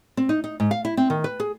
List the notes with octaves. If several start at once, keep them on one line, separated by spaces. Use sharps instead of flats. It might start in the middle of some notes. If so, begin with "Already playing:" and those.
C4
D#4
D#4
G#2
F5
E4
C4
D#3
B4
G#4